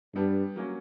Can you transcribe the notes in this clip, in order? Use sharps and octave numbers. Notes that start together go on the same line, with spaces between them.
G2 G3 B3 D4
F#3 A#3 C#4